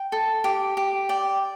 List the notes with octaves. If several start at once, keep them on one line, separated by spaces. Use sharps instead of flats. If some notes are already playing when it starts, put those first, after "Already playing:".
Already playing: G5
A4
G4
G4
D5 G5